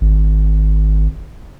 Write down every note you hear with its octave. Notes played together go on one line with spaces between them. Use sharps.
G#1